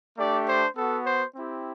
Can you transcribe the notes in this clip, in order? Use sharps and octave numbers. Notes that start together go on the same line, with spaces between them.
A3 D4 G4 D5
C5
B3 F#4 A4
C5
C4 E4 G4